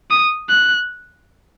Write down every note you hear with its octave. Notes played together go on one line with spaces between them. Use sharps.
D#6
F#6